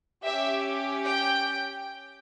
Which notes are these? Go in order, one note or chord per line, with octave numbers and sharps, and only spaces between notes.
C#4 G4 E5
G5